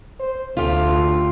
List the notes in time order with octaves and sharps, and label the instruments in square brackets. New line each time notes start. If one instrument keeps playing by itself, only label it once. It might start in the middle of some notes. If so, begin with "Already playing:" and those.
[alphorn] C5
[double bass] D2 [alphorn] A3 [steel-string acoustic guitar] F4 G4